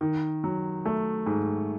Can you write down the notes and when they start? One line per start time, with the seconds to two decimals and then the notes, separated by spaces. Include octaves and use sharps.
0.01 D#3
0.44 F#3
0.85 A3
1.26 G#2